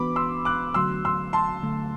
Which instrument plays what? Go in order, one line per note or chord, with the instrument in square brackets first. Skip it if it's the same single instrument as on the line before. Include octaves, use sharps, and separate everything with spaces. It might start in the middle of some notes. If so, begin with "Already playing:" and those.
Already playing: [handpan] E3 B3 D4 F#4 [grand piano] B5 D6
[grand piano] C6 E6
D6 F#6
[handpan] D3 F#3 A3 [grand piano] C6 E6
[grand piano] C6 E6
A5 C6
[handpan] D3 F#3 A3